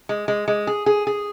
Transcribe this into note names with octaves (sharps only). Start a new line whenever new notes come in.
G#3
G#3
G#3
G#4
G#4
G#4